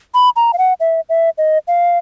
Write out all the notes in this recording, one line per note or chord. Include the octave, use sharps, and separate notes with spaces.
B5
A#5
F5
F#5
E5
E5
D#5
F5